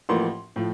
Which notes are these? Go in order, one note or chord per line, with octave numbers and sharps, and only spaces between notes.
A1 A2 F3 A#3 C6
A2 F3